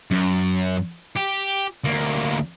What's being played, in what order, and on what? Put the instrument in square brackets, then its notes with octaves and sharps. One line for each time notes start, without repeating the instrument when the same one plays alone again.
[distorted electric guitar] F#2
G4
D2 A#3